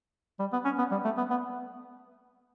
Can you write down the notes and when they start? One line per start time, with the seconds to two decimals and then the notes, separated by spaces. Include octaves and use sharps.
0.39 G3
0.52 B3
0.65 C#4
0.78 B3
0.91 G3
1.04 A3
1.17 B3
1.30 B3